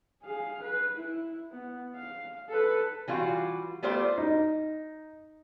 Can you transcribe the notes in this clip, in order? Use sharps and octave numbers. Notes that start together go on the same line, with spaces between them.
G#4 F5
B4
E4
B3
F5
A4 B4
E3 G3 F4 F#4
G3 A3 B3 F4 C5 D5
D#4